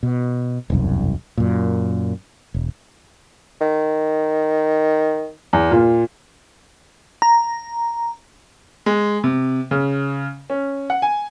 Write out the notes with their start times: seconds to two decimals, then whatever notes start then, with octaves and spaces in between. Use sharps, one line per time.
0.03 B2
0.70 E1 C2 F#2
1.38 F#2 A#2
2.54 E1
3.61 D#3
5.53 E2
5.70 A#2 F4
7.22 A#5
8.86 G#3
9.24 C3
9.71 C#3
10.50 C#4
10.90 F#5
11.02 G#5